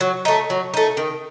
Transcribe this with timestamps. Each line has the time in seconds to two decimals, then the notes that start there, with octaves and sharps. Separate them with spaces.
0.01 F#3
0.25 A3 D#4
0.50 F#3
0.74 A3 D#4
0.97 D#3